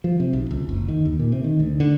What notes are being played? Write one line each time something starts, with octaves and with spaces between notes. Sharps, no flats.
F3
C3
B1
C#2
F#1
D#3
D#2
A#2
C3
D#3
D2
D3